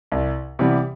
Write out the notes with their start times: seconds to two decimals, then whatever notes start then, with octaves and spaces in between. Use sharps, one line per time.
0.12 C2
0.59 C3 E3 G3 B3